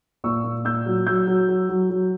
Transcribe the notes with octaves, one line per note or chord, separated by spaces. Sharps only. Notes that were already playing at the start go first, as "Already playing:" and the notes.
A#2 C#6 E6
A#2
A#2 E6 G6
F#3
F#3 E6 G6
F#3
F#3
F#3
F#3